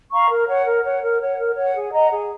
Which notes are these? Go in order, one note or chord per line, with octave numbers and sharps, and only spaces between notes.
F5 A#5 C#6
A#4
C#5 F#5
A#4
C#5 F#5
A#4
C#5 F#5
A#4
C#5 F#5
G#4
D#5 F#5 A#5
G#4